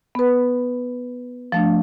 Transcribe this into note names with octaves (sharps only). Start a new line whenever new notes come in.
B3 B4
F3 A3 D4